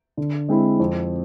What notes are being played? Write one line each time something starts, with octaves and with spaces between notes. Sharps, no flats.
D3
G#3 C4 E4
F2